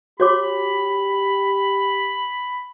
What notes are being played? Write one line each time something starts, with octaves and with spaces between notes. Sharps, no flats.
F#4 G4 C#5 B5 D6